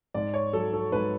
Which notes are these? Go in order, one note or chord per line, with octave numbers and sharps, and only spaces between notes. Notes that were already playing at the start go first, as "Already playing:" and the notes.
G#2 D5
C#5
F#3 A4
A4
G#2 B4